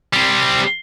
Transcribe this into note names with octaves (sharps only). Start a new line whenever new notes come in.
G3 C4